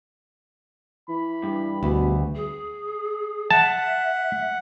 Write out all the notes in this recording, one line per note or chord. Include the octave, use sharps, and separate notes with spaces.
E3 B5
G2
D2 B2
G#4
E5 F#5 A5